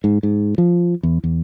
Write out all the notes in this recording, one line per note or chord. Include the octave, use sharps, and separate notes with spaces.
G#2
G#2
F3
E2
E2